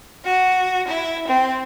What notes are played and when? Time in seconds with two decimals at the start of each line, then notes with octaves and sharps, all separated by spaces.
0.24 F#4
0.88 E4
1.28 C4